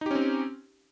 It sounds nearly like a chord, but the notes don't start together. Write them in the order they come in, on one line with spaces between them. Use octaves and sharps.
D#4 G4 C#4 C4